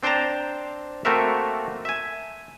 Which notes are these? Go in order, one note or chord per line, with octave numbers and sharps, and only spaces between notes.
C4 D4 C5 G5 A5 A#5
A3 A#3 C4 F#4 A#4 E5
E5 G#5